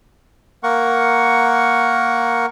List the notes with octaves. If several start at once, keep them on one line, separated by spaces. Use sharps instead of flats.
A#3 A#4 F#5 C#6